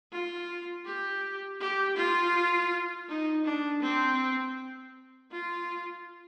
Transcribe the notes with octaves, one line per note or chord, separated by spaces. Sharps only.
F4
G4
G4
F4
D#4
D4
C4
F4